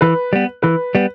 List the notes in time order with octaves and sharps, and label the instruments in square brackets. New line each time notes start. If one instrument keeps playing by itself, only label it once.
[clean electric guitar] E3 [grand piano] B4
[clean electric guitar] G3 B3
[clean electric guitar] E3 [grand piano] B4
[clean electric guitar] G3 B3